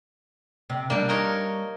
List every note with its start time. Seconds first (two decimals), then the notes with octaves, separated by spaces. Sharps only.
0.70 C3
0.90 G3 A#3 D4
1.09 D#4 A#4 C#5